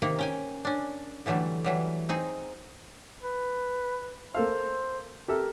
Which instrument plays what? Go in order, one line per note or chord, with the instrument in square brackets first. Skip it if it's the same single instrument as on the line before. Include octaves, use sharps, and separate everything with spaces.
[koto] C3 D#3 A#3 A#4
C#4 G5 G#5
C#4 D4
D3 E3 F#3 G3 A3
E3 F#3 G3
C4 D#4 G#4
[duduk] B4
[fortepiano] A#3 A4 F5 [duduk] C5
[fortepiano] G4 A4 E5 [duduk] A#4